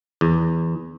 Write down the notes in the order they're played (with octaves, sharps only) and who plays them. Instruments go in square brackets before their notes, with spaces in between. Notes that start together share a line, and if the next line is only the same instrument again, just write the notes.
[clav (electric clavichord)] E2